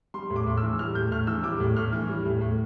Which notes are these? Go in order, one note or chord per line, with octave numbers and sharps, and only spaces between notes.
G3 C6
A2
D6
A2
E6
E3
G3 F6
A2 G6
A2 F6
E3 E6
G3 D6
A2
A2 F6
E3
G3
A2
A2